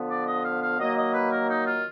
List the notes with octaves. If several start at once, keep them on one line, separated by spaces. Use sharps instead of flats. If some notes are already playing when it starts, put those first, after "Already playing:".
Already playing: D3 F3 B3
D5
D#5
F5
F5
D#3 F#3 A#3 D#5
D#5
B4
A#4
D#4
F4